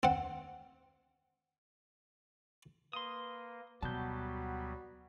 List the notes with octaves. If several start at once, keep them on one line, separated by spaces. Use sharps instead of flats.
C4 F#5
A#3 B4 C6 D#6
D2 B2 F#3 G3 B3 F#4 A5 G6